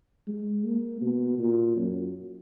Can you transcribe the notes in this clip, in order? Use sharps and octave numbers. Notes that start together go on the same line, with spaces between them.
G#3
A#3
B2
A#2
F#2